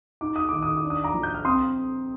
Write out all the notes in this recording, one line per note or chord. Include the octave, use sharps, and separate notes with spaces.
D#4 D6
D#6
D#3 D6
D#6
D6
D4
D#6
A#5 D6
F3
G6
F6
C4 C6 D#6